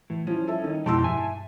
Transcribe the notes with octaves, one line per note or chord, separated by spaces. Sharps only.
A2 E3
F3 G3 C#4 E4
A4 E5
D#3
F2 B2 G#3 E4 G4 A5 C6 E6
G2 E5 G#5